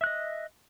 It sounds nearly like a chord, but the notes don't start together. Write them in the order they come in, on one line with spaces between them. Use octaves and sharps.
E5 F#6 D#5